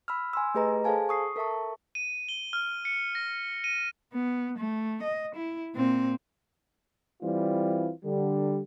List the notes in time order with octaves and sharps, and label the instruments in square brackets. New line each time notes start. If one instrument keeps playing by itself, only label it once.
[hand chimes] B5 E6 F6
G#5 C6 E6
A3 G4 G#4 B4 D#5 A#5
G#4 A4 C5 F5 G#5 A5
C#6 D#6 C7
A4 A#4 E5 A5 C#6
[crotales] D#7
G7
F6
C#7
A#6
D#7
[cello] B3
A3
D#5
E4
A#2 C4
[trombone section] E3 G3 C4 F4
D3 G3